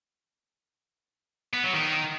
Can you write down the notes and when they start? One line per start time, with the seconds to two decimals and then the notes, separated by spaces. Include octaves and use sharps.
1.54 B3
1.64 F#3
1.74 D#3